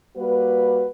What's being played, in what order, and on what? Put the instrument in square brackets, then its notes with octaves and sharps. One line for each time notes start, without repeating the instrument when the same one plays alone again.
[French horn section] G3 A#3 F#4 B4